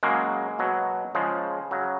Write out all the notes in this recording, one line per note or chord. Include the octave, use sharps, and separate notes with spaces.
C#3 F#3 G#3 A#3
B2 F#3
C#3 F3 G#3
C#3 F#3